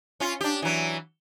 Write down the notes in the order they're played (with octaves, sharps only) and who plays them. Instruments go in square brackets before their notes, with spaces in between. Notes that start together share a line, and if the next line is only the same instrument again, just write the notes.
[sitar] C#4 F4
D4 G4
E3 F#3